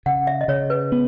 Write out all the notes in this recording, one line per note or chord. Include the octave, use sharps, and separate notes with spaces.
C#3 F#5
E5
D#5
C#3 C#5
B4
B3